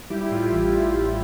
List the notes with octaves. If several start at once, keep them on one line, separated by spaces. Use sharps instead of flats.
G3 E4 G4
E4 G4
A2 F4
F4
A1 E4
F4
A1
E4
A1 F4